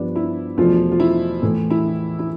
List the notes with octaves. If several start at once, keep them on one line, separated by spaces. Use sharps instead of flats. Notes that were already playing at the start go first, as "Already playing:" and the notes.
Already playing: G2 F3 B3 D4
E4
E2 B2 F3 A3 F4
F4
E4
A2 E3 A3
E4
E4